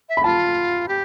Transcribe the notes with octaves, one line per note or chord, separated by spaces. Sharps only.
E5
B5
F4 A5
G4